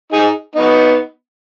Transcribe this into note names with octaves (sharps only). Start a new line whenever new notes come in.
D#4 G#4
B3 D#4